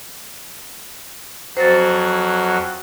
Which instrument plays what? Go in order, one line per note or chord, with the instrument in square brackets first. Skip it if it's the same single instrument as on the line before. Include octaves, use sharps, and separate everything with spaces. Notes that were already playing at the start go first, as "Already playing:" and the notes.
[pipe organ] F2 F#3 F#4 [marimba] C5 A6